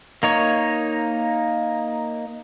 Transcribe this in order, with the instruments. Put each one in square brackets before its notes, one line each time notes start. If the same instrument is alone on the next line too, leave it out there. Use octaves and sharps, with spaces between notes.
[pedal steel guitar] A#3 D#4 C#5